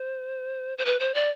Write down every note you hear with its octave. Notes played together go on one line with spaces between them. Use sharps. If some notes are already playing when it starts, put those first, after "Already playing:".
Already playing: C5
C5
B4
C5
D5